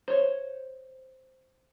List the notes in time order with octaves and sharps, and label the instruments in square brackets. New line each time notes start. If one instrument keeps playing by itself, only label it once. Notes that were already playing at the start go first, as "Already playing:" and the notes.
[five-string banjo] C5 C#5